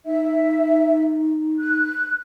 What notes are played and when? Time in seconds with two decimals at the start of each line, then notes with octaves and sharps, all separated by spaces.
0.06 D#4 E5
1.59 F#6